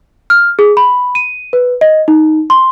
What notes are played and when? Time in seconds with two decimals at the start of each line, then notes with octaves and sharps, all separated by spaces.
0.30 F6
0.59 G#4
0.77 B5
1.15 D#7
1.53 B4
1.81 D#5
2.08 D#4
2.50 C6